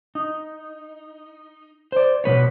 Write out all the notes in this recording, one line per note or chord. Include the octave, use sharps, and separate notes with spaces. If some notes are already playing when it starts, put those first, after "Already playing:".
D#4
C5 D5
B2 G#3 B4 C#5